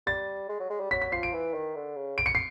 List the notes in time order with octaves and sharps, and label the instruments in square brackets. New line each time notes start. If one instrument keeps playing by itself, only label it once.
[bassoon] G3 [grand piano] A6
[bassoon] G#3
F#3
G#3
G3
[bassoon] F#3 [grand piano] B6
[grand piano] B6
[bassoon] F3 [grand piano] C7
[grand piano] D7
[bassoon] E3
D#3
D3
C#3
[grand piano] D7
C#7
C7